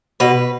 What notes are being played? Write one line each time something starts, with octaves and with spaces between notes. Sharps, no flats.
B2 B4